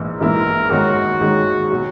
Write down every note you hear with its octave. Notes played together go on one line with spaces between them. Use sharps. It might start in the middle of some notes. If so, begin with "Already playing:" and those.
Already playing: A#1 G#2 E3 A#3 E4
A#1 G#2 E3 A#3 E4 A#4
G#2 D#3 G#3 C#4 F#4
G#2 D#3 G#3 C#4
B2 F#3